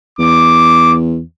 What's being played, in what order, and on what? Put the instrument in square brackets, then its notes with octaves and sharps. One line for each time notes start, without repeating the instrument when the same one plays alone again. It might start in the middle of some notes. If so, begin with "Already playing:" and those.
[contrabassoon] E2 [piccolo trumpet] D6